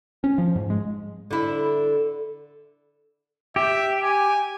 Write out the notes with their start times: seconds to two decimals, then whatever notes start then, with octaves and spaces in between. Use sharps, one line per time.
0.24 C#4
0.38 F3
0.56 G#2
0.70 G#3
1.31 D3 E4
3.56 G4 E5
4.03 G#5